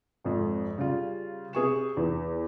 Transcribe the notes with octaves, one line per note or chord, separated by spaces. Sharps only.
G#1 F2
C#3 G3 F4
C3 G#4 C#6 E7
E2